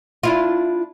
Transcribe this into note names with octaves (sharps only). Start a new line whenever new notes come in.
D4 E4 F4